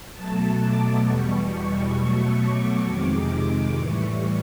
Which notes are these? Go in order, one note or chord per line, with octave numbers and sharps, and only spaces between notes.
B2 F#3 A3 A5
D6
E2 B2 G3 C#6
B2 F#3 A3
D6
F2 C3 D#3 G#3
D6
A2 E3 G3 C#6